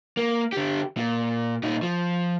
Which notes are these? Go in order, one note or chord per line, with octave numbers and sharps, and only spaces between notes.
A#3
D3 G4
A#2
A#2 D#4
F3